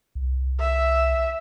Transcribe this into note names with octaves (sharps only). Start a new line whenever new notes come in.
C2
E5